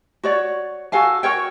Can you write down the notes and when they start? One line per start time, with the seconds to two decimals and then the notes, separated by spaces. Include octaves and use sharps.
0.23 F#4 C#5 D5
0.92 F#4 A4 F5 G#5
1.23 F#4 A#4 C#5 G5